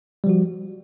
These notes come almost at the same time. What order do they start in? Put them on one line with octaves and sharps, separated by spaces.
G3 F3 F#4